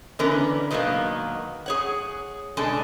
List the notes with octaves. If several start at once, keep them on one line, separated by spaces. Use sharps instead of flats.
D3 E3 B3 C#4 A#4 B4
B2 D#3 F#3 G#3 A#3 B3
G#4 C#5 F#5
B2 G#3 D4 A4 G#5